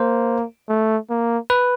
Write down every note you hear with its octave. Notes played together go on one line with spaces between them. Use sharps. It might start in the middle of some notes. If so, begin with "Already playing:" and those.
Already playing: A#3 C5
A3
A#3
B4